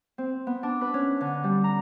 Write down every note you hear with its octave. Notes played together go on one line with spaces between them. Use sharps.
C4
B3
D4
B4
C#4
D3
G3
A#5